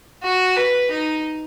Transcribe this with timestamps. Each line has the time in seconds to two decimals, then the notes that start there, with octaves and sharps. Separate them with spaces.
0.23 F#4
0.56 B4
0.90 D#4